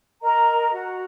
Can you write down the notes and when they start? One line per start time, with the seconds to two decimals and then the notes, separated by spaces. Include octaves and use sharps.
0.22 A#4 D#5 A#5
0.72 F#4